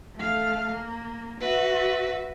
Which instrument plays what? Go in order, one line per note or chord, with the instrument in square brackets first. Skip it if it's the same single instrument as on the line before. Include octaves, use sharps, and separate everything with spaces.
[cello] A3 F5
A#3
[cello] F#4 E5 [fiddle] B4